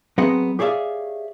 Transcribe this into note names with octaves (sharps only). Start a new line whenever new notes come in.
F#3 B3 C4 G#4 D#5 F#5
G4 G#4 C#5 D5 E5 F5